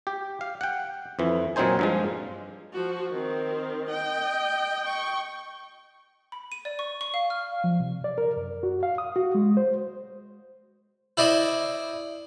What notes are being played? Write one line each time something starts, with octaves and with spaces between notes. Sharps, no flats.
G4
F5
F#5 G5
F2 E3
A#2 F#3 C4 D#4 C5 G#5
G2 F3 G#3
F3 F#4
D#3 C4
D#5 G5
G5 C#6
B5
D#7
D5
C#6
C#6
F5
F6
F3
C3
D5
A#4
F#2
F#4
F5
D#6
F#4
G#3
C5
E4 C5 D5 D#5